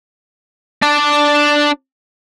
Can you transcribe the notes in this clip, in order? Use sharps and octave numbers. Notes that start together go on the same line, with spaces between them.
D4 D5